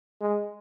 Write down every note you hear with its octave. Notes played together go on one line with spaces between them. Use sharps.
G#3